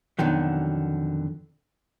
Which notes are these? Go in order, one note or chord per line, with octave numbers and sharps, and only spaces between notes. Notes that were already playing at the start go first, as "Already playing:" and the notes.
F2 B2 D3 D#3 F#3